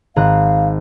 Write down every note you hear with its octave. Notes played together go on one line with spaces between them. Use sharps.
G#1 F5 A#5 F#6